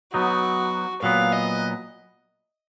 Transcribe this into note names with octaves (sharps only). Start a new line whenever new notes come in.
F#3 B3 D#4 F#4
A#2 F#3 B3 F5
D#5